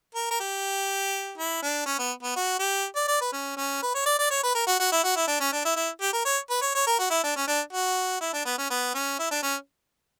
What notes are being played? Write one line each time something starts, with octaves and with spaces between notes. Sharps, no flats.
A#4
A#4
G4
E4
D4
C#4
B3
B3
F#4
G4
D5
D5
B4
C#4
C#4
B4
C#5
D5
D5
C#5
B4
A#4
F#4
F#4
E4
F#4
E4
D4
C#4
D4
E4
E4
G4
A#4
C#5
B4
C#5
C#5
A#4
F#4
E4
D4
C#4
D4
F#4
E4
D4
B3
C#4
B3
C#4
E4
D4
C#4